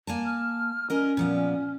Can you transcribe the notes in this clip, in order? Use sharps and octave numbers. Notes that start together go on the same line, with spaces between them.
A#3 G#5 A5
F6
C#4 A#4 D#5
A#2 F3 B3